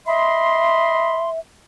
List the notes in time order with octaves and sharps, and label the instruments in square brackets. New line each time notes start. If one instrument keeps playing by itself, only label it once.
[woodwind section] D#5 B5 C6 [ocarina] E5